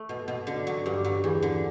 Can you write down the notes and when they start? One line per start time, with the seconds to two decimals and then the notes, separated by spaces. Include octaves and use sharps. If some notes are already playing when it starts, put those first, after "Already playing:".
Already playing: A3
0.09 B2
0.28 B2
0.47 D3
0.67 F#3
0.86 G2
1.04 F#3
1.24 E2
1.42 D3